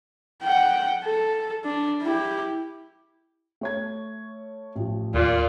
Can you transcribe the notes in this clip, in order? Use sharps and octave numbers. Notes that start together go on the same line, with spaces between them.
F#5 G5
A4
D4
E4 G4
A3 C#5 G#6
A1 F3
D#2 A#2 F4 D5